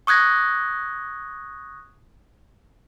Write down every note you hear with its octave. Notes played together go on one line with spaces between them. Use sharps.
C#6 D#6 F#6 G#6 A#6